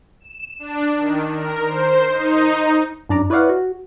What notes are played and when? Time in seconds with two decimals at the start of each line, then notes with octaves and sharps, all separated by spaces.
0.20 E7
0.59 D4
0.97 D#3
1.34 A#4
1.66 C5
2.09 D#4
3.09 F#2 D4 D5 A#5 D6
3.30 E4 B4 C#5 D5 F5 F#5
3.49 F#4